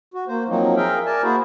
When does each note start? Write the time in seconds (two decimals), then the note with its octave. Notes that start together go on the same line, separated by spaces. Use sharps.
0.14 F#4
0.28 A#3 C5
0.48 F3 F#3 A#3 C4 D#4
0.76 G#4 A#4 E5 F5 G5
1.06 A#4 D5 G#5 A5
1.23 A#3 E4 F#4 G#4 C5